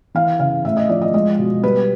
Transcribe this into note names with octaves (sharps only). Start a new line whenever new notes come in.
E3 F5
C#3 F5
A2 E5
D#5
F3 D5
D#5
G#3 D#5
B2
G3 B4